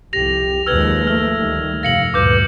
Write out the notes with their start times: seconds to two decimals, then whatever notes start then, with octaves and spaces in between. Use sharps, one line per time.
0.13 C2 F2 G4 A#6 F7
0.66 D#2 F3 G#3 B4 E6 F6 G#6
1.07 A3 F6
1.36 D2 D#3 G3
1.83 F1 G2 C3 F5 A#6 C#7 F#7
2.14 D2 G2 A#2 B4 D6 G6